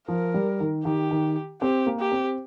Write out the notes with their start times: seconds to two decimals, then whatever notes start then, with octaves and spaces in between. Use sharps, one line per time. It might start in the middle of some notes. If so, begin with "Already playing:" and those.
0.08 F3 A#4
0.34 G3
0.60 D#3
0.85 D#3 G4
1.11 D#3
1.62 C4 G4
1.87 A#3
2.00 G4
2.12 C4